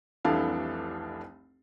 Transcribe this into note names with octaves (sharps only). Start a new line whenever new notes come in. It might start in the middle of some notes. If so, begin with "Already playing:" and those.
F1 C2 E3 D4 A4 F5